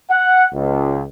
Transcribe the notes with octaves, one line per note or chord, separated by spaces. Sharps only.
F#5
C#2